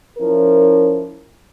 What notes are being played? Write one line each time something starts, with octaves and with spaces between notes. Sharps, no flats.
F3 C#4 E4 A#4